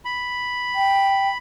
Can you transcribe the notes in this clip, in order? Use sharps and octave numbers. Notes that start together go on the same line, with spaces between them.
B5
G5